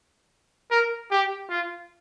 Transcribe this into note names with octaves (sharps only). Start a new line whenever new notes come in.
A#4
G4
F4